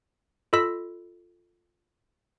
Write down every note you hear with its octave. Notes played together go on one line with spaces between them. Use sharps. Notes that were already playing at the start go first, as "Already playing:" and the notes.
F4 A4 D#5 B5 E6 B6